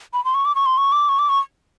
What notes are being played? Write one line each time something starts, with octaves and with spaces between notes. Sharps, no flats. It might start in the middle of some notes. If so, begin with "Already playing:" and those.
B5
C6
C#6
D6
C#6
C6
C#6
D6
C#6
D6
C#6